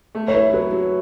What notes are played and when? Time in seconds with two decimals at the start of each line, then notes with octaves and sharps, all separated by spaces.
0.15 A3
0.28 C#5
0.34 E4 B4
0.53 F#3 B4
0.72 F#3